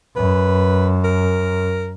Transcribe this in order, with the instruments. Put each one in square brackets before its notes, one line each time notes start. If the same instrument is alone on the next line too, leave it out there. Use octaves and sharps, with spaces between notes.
[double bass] F#2 [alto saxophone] B4
[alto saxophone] A#4